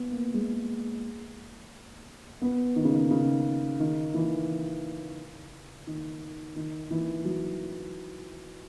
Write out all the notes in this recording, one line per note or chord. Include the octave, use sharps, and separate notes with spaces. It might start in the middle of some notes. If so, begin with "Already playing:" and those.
Already playing: B3
A#3
G#3
B3
D#3
C#3
D#3
C#3
D#3
E3
D#3
D#3
E3
F#3